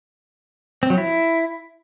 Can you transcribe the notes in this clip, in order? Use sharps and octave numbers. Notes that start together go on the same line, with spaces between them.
C4
F#3
E4